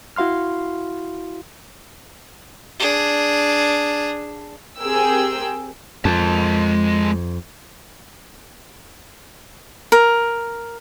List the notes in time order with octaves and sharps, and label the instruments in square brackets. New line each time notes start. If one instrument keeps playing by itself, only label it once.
[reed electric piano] E4 F#4 F5 C6 F6
[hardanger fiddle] D4 G#4
[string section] C4 G4 G#4 A#4 G5 E6
[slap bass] F2 [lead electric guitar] G#3 A5
[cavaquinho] A#4